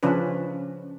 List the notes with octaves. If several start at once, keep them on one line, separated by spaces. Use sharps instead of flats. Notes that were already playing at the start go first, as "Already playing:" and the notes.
C#3 F3 C#4 D4 B4